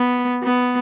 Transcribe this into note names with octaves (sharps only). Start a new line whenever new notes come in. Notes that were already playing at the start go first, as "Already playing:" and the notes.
Already playing: B3
B3